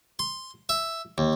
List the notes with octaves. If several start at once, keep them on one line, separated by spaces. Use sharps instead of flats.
C6
E5
D#2